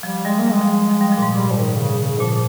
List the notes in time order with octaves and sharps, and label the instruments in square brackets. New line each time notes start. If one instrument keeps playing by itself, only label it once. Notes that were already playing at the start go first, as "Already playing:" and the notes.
[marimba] F3 [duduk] G3
[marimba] G3 [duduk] G#3
[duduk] A#3
[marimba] G3
[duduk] G#3
[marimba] F3
F3
G3
F3
A#2
G#2
[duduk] G3
F3
D#3
C#3
C#3
[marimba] A#2 [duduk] F3